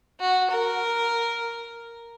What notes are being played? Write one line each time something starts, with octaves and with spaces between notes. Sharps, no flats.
F#4
A#4